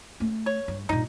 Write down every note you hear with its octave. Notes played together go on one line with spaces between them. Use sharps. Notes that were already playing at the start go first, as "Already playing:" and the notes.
A3 C#4
C#5
G2
G2 A#2 D#4